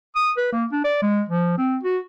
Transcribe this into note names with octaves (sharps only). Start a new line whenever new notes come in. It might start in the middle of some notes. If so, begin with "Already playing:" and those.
D#6
B4
A#3
D4
D5
G#3
F3
C4
F#4